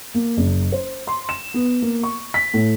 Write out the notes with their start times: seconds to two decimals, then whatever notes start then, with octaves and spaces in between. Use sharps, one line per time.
0.15 A#3
0.37 F#1
0.72 C5
1.07 C6
1.29 E7
1.54 B3
1.82 A#3
2.03 C#6
2.34 B6
2.54 A2